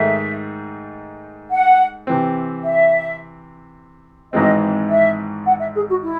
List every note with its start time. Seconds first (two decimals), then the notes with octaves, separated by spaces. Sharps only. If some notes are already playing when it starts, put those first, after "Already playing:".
Already playing: G#2 D#3 A3 D#4 G#4 E5
1.50 F#5
2.07 C3 E3 C4
2.64 E5
4.33 G#1 G#2 E3 G#3 C4 D#5
4.90 E5
5.46 F#5
5.60 E5
5.74 G#4
5.89 F#4
6.03 E4